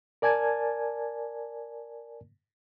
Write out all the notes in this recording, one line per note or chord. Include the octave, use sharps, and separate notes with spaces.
A#4 D5 G#5 A5 G#6